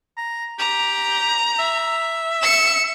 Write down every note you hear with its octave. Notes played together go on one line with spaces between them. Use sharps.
A#5
G4 A#5
E5
C#7 E7